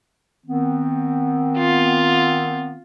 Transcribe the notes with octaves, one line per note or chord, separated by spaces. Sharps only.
D#3 B3 C4
F4